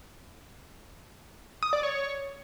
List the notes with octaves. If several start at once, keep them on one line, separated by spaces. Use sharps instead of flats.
D#6
D5
C#5